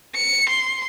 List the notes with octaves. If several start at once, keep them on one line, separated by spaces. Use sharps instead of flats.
C#7
C6